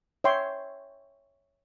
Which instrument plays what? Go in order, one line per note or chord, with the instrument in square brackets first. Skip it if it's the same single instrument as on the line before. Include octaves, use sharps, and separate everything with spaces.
[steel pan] C#5 E5 G5 C6